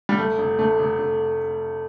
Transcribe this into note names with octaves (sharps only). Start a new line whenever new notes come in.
G3
F1 A3
F1
F1 A3
F1
F1